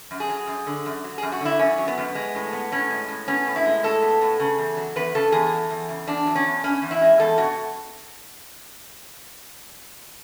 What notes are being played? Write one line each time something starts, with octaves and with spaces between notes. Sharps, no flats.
F#2
G#4
F#3
F#2
D3
F#2
F#3
F#2 G#4
F#4
D3 E4
F#2 C#4
F#3
B3
F#2
G#3
A2
B3
A2 C#4
G#3
A2
B3 C#4
A2
E4
G#3
A2 A4
B3
A2
C#3
E2
F#3
E2 B4
C#3 A4
E2 G#4
F#3
E2
C#3
E2 D4
F#3
C#4
E2
B2 C#4
E2
E4
G#3
E2 A4
B2 F#4